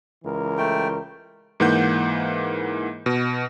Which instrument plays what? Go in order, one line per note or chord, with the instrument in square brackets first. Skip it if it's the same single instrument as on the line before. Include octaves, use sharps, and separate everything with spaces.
[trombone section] C#2 E3 A#4
[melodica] A3 G5
[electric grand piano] G#2 E3 A#3 F#5 G6
B2